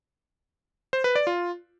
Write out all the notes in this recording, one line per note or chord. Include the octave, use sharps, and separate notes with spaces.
C5
B4
D5
F4